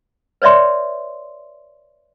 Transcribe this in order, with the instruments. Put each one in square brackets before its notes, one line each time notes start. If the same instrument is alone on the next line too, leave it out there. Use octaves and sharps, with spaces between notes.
[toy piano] B4 C#5 D5 E5 C6